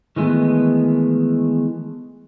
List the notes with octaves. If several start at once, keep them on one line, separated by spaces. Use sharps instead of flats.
D#3 E3 G#3 A3 B3